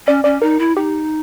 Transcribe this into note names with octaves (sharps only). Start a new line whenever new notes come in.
C#4 D5
C#4 D5
D#4 A#4
E4
D#4 G4